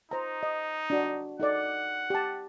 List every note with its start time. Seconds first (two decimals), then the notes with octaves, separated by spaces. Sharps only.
0.11 D#4 C5 A#5
0.43 D#5
0.90 D4 F#4
1.40 D#4 A4 D5 F#5
2.10 G4 A5